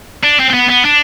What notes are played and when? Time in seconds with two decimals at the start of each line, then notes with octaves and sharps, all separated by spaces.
0.23 D4
0.40 C4
0.50 C4
0.54 B3
0.69 B3
0.85 D4